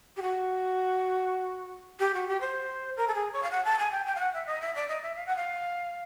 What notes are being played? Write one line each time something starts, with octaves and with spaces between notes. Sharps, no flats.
G4
F#4
G4
F#4
G4
C5
A#4
A4
G#4
C#5
F5
F#5
A5
G#5
G5
G5
F5
F#5
E5
D#5
E5
D5
D#5
E5
F5
F#5
F5